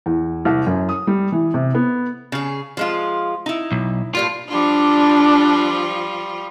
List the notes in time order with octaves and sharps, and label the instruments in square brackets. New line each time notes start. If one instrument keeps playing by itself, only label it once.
[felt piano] E2
C2
F#2
D#6
G3
E3
C3
B3
[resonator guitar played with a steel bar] C#3 G#4
F3 G#3 F4
D#4 E4
[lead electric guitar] B1
[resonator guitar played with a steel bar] A2 G3 A#3 [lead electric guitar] F4
[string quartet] F3 G3 F4 [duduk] D4